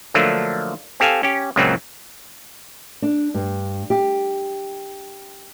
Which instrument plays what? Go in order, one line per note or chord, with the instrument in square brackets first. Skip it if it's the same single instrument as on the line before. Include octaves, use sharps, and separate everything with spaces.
[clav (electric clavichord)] D3 F3 F#3 A3 A#3 D4
C4 G4 A4 F5 G#5
C#4 G4
C#2 F#2 A#2 C#3 F#3 C4
[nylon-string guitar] D4
G2
G4